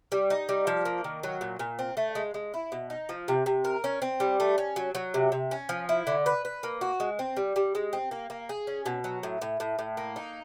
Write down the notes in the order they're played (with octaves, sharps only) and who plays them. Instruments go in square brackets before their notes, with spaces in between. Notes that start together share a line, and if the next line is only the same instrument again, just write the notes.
[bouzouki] G3
D#4
G3
F3
A#3
D#3
F#3
A#2
A#2
C4
A3
G#3
G#3
E4
B2
D#4
F3
C3
C3
A#4
C#4
C4
G3
A3
C#4
F#3
F#3
C3
C3
C#4
F3
E4
D3
B4
B4
A#3
F#4
G#3
C4
G3
G3
G#3
C4
A#3
A#3
G#4
C#4
B2
F#3
A2
A2
A2
A2
A#3
D#4